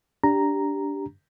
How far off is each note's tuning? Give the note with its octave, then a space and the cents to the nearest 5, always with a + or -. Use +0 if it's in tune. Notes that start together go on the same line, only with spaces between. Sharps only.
D4 -15 G4 +0 A#5 +0